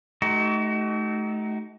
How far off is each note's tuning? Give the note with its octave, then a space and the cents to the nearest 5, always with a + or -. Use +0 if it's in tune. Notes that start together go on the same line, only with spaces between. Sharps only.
A3 -25 D#4 +0 F#4 +40